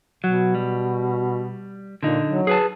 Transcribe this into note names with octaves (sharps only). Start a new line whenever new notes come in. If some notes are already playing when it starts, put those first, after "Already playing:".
B2 F#3
G3
A#2 D3 D#4
F#3
G#4 B4 A5